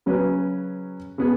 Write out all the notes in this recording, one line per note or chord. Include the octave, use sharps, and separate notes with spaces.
C#3 F#3 C#4 B4
C#3 B3 G#4